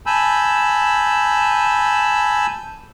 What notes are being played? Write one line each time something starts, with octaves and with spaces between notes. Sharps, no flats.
G#5 A5 B5 E6 G6